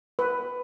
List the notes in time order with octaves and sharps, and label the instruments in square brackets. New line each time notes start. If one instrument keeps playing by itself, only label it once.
[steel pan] B4